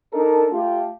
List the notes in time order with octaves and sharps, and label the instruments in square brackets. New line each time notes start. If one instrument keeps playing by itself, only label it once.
[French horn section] D4 D#4 A4 A#4
A3 F4 G4